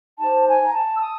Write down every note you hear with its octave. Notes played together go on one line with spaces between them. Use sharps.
D#4 G4 C5 A5
G#5
A#5
A5
E6
D#6